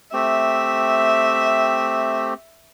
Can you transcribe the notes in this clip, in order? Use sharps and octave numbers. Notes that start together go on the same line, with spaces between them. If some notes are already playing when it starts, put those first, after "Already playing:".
A3 C4 G4 E5